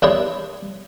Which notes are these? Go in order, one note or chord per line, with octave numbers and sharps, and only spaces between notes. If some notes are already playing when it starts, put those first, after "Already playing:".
D#2 D4 E4 G4 C#5 C6